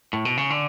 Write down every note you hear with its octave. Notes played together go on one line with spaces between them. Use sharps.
A2
B2
C#3
D3